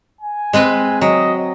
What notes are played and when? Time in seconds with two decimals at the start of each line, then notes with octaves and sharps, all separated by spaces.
0.21 G#5
0.53 G#3 C4 B4
1.01 F#3 D#5